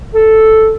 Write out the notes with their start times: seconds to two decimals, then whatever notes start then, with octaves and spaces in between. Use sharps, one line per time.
0.14 A4